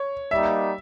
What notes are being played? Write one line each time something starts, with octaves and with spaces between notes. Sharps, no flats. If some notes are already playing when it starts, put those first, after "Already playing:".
Already playing: C#5
G3 A#3 D#4 E5